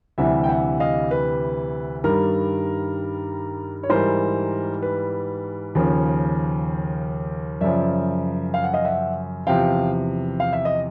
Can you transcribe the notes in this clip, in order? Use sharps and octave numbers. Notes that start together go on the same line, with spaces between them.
D2 C3 E3 G3 E5 F#5
G5
E5 F#5
D#5 F5
B4
G2 D#3 G3 A#4
C#5
G#2 E3 G3 A#4 C5
B4
D#2 C#3 F3
F#2 C#3 F3 D5 E5
F5
F#5
D#5 F5
E5 F#5
E2 C3 F3 F5 G5
F5
E5
D#5